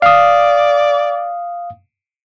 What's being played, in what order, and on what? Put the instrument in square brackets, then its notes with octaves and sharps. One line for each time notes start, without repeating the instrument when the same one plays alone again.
[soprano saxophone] D5 [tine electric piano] F5 D#6